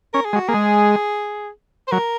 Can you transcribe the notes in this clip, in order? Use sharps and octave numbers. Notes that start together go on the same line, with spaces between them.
C#4 A#4
G#4
G#3
F#4
A#3 G#4
G#3
C5
F#3 A#4